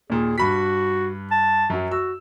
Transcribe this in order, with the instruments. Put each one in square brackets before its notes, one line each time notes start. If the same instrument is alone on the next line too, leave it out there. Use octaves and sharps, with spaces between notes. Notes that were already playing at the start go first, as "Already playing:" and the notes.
[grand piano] D#2 A#2 [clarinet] G#4
[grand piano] G2 B5 B6 [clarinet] F#4
[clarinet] A5
[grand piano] F#2 F#3
[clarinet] F#4 [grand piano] E6